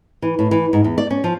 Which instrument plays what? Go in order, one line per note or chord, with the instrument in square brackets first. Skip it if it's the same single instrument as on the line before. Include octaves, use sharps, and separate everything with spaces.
[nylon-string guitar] E3
A2
E3
G#2
E2
D5
C#4
F3